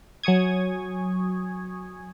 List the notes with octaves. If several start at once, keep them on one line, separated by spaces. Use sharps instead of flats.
F#3 G#5 C#6 D#6 G#6